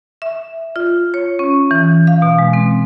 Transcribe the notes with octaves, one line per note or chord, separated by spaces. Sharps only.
E5
F4
C#5
C#4
E3
F5
B2
G#3
C4